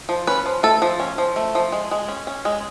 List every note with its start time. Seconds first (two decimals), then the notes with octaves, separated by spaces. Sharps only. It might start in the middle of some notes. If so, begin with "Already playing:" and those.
0.09 F3
0.27 C#4 B4
0.46 F3
0.63 A3 A4
0.82 F3
1.00 C#4
1.18 F3
1.36 A3
1.55 F3
1.72 G#3
1.91 G#3
2.08 C#4
2.27 C#4
2.45 G#3